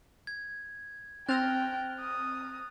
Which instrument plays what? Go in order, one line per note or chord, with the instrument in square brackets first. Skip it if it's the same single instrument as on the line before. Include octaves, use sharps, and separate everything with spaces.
[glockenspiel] G#6
[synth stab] C4 F6 A#6 [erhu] G5 [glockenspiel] F#6 A6 F7
[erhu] D#6